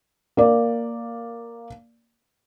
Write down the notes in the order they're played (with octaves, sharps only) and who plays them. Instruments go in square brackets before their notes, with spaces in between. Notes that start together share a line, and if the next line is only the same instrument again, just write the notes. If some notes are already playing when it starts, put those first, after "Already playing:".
[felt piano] A#3 D5